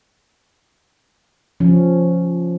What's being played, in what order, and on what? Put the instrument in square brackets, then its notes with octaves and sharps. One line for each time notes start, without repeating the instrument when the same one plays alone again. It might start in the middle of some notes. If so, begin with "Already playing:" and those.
[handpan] F3 C#4